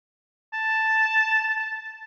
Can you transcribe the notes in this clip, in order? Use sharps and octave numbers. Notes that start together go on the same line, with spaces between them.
A5